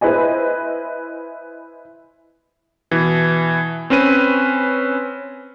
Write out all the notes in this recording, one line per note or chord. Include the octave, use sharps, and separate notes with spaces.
E4 B4 C5 D#5 G#5
B2 E3
C4 C#4 B4 D#7